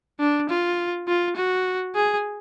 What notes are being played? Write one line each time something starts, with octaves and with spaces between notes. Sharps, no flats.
D4
F4
F4
F#4
G#4